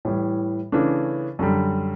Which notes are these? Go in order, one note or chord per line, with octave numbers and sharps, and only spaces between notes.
A2 E3 G3
C#3 E3 A3 D4
F#2 D3 G3